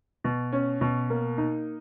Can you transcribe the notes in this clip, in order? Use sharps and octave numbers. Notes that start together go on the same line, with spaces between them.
B2
C#4
B2
A#3
D#4